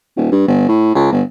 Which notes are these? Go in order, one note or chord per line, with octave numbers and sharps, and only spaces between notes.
D#1
G2
G1
A2
C#2
G1